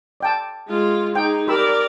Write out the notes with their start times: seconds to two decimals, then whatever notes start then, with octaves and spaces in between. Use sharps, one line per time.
0.20 D5 G5 A5
0.68 G#3 F4
1.16 D#4 G#4 G5
1.48 G4 A#4 D5 B5 E6